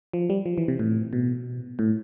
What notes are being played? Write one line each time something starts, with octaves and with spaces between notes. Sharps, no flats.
F3
G3
F3
E3
C3
A2
B2
A2